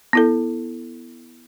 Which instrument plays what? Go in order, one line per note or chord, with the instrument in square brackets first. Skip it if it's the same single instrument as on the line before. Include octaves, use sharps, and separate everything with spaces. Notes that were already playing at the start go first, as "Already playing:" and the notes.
[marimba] B3 E4 A4